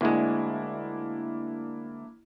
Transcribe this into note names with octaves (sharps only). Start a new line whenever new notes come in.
D2 G#3 A#3 D4 E4